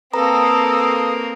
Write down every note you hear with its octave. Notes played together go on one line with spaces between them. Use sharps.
A#3 C4 A4 B4 A#5 D#6